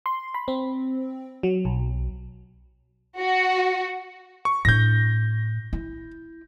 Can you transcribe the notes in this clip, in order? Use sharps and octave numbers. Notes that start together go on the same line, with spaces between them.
C6
B5
C4
F#3
B1
F#4
C#6
A2 D4 G6 A#6
E4